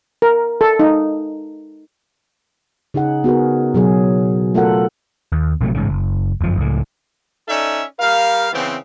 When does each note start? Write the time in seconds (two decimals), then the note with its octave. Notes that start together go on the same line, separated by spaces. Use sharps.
0.22 A#4
0.61 A4
0.79 D#4
2.94 C#3 D#4 G#4 F#5
3.24 B3 F#4 G#4 A#4
3.74 B2 F#3 G#4
4.54 A3 F4 A4 A#4 F#5
5.32 D#2
5.61 A#1 C3 F#3 A3
5.75 A1 G#2 C#3
5.89 F#1
6.41 G1 F#2 F3
6.57 C#2 A2
7.48 C#4 D#4 A4 D5 E5
8.00 G3 A#4 F5
8.53 C#3 E3 B3 C4